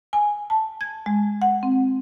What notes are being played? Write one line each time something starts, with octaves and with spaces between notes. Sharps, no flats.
G#5
A5
G#6
G#3
F#5
C4